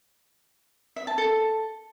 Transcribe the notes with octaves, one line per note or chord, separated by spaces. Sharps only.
E5
A5
A4